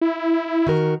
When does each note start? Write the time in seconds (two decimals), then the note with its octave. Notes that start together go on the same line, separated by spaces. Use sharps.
0.01 E4
0.67 D#3 F#4 A#4